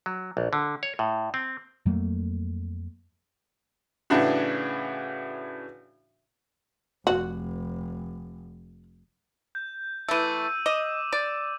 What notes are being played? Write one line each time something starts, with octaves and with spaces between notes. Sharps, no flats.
F#3
A#1
D3
C#5
A2
C4
F2 F#3 A3 A#3
A2 C#3 E3 D4 F#4
F1 F#4
G6
E3 A3 E6 D#7
D#5 D6
D5